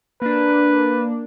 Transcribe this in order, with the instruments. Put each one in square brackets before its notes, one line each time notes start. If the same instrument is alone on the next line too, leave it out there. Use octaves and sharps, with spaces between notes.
[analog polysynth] A#3 D4 [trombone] B4